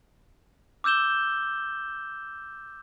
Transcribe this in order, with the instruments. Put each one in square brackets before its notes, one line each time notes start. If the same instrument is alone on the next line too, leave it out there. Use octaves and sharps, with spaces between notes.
[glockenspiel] D6 E6 G6 E7 G7